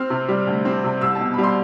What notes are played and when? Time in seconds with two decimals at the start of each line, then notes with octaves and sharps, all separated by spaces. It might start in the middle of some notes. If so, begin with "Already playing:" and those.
Already playing: C4 F6
0.10 C3
0.28 G3
0.47 D2
0.65 C4
0.84 C3
1.01 C2 E6
1.15 A5
1.20 B2
1.34 B5
1.38 G3
1.43 C6